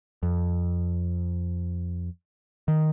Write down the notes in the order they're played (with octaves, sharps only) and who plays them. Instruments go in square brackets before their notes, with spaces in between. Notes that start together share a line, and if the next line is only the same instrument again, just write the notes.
[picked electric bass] F2
D#3